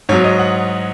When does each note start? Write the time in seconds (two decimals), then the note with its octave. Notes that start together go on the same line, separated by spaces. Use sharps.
0.09 G#2 F#3 C#5
0.24 D#5
0.39 F#5